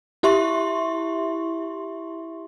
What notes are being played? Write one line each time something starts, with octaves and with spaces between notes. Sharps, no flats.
E4 G4 E5 C6 C#6